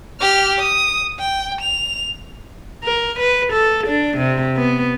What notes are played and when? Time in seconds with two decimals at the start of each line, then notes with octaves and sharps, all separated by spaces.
0.20 G4 F6
0.59 D#6
1.19 G5
1.61 F7
2.83 A#4
3.19 B4
3.53 A4
3.87 D4
4.17 C3
4.56 B3